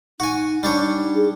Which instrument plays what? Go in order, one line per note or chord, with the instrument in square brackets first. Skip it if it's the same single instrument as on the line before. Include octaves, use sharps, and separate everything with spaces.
[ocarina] D#4 [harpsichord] F#4 G#5
[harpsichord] G3 D4 C#5
[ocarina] D#4
G#4